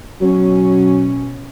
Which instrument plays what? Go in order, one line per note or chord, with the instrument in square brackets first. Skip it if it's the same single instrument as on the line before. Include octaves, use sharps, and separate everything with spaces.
[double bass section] B2 C#4 [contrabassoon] F#3